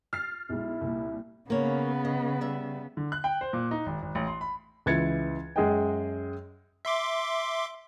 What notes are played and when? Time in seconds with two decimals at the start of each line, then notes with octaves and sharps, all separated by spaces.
0.13 F6 A6 C7
0.50 B1 G#3 E4
0.81 C2 A#2
1.50 C#3 A#3 B3 C#5
2.05 D#5
2.41 G3 E5
2.97 D3
3.12 F#6
3.24 G5
3.41 C5
3.53 A#2
3.71 D#4
3.86 G#1
4.02 G#1
4.15 A1
4.27 C6
4.41 B5
4.86 C#2 E3 G#6 A6 C#7
5.56 F#2 G#3 G#4 D#5 F#5 G5
6.85 E5 C6 D6